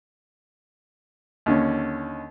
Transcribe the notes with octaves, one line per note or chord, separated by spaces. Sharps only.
D#2 D3 C#4